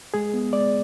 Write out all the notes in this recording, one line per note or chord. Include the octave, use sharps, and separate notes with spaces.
G#3 G#4
B3
G#3 D5